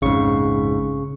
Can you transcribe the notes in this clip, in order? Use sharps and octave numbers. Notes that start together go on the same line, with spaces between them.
A#1 F2 G#2 C#3 C#6